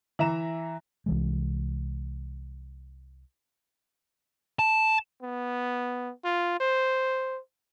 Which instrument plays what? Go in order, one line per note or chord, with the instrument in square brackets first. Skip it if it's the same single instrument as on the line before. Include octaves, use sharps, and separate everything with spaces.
[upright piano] E3 E5 A#5 E7
[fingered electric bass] C2 E3 G#3
[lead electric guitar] A5
[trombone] B3
F4
C5